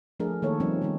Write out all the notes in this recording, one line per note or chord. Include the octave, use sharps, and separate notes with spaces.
F3 A3 D4 G#4 A#4
D#3 A3 A#3 A4 C#5
F3 G3 C4 C#4 D#4
D#3 G3 A3 D#4